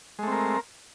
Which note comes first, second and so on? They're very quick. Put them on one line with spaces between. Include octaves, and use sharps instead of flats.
G#3 A3 C4 A#4